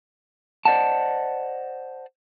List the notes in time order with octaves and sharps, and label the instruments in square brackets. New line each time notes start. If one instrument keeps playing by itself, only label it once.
[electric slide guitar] C5 D5 D#5 F#5 A5